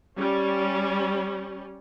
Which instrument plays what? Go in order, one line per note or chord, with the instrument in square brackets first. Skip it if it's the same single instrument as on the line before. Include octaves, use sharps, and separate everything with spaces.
[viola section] G3 C#4